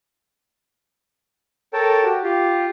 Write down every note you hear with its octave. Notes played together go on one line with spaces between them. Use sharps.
A4 A#4 C#5 G5 A5
F#4 G4
F4 G4